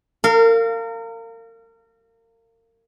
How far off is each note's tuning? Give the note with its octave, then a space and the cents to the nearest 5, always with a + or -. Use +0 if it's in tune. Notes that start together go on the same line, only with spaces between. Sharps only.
A#4 -35 F5 -10